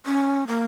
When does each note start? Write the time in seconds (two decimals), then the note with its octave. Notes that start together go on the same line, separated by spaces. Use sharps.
0.06 C#4
0.47 A#3